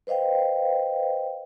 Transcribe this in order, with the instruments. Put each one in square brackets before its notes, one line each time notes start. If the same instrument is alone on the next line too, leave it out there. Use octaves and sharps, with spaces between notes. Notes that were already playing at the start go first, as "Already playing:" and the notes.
[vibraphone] B4 C5 D#5 F5 G5